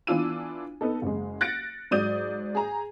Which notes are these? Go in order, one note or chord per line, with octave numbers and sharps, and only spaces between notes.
E3 B3 D4 F4 E6 D#7
B3 D#4 A4
F#1 G#3
F#6 A6 A#6 C#7 D7
G#2 F#3 D5 D#6 G6 D#7
G#4 A#5